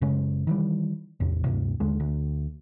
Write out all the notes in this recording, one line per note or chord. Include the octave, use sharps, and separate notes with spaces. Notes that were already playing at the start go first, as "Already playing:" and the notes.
F#1 C#3 G#3 C#4
D#3 E3 G3
A1 E2 C3
D2 G2 C3
D#2 D3 G#3
D2